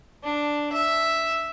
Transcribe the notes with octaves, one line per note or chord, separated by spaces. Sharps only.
D4
E5